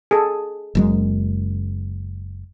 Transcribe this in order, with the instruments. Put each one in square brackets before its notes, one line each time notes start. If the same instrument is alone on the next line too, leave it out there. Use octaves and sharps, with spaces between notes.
[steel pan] G#4 A4
[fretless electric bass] F#1 F#2 G#3